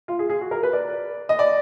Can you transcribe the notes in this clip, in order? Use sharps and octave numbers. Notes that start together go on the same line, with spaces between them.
F4
G#4
G#4
F#4
A#4
B4
D5
D#5
D5